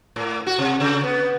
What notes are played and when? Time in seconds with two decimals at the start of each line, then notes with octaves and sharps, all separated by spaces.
0.16 A2
0.47 F#4
0.58 C3
0.80 C#3
1.04 B3